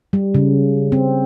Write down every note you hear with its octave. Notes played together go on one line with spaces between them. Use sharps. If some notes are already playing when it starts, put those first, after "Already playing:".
G3
C#3
C4